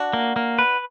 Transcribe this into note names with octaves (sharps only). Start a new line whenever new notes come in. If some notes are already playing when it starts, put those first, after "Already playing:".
Already playing: D4 F#4
A#3
A#3
B4